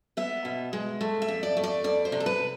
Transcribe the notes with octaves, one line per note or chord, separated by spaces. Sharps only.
B3 E5
B2
G#3
A3
E5
F2
D5
A3
D5
F2 D5
C5
C3
A4
B4